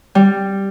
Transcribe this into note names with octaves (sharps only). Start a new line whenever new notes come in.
G3